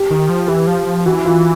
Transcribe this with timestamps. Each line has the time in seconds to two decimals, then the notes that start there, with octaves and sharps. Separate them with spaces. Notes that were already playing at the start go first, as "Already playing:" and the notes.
Already playing: G4
0.10 D#3
0.29 F3
0.48 E3 G4
0.67 F3
0.86 F3
1.06 E3 F#4
1.25 F4